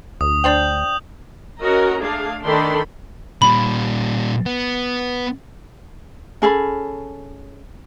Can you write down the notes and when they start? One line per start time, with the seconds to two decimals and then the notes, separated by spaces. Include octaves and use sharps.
0.21 D2 D#6
0.44 D4 C5 G5 G6 F#7
1.61 C#4 F#4 A#4 D#5 A#5
2.02 A3 D4 G#4 F5
2.44 D#3 D4 A4 B5 C6
3.42 A#2 G3 B5
4.46 B3
6.42 C#4 G#4 A4 B5